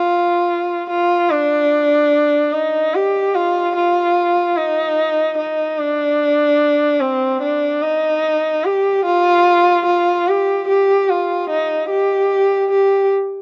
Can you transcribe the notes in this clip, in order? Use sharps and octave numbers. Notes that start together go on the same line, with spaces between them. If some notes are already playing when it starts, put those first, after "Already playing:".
Already playing: F4
F4
D4
D#4
G4
F4
F4
D#4
D#4
D4
C4
D4
D#4
G4
F4
F4
G4
G4
F4
D#4
G4
G4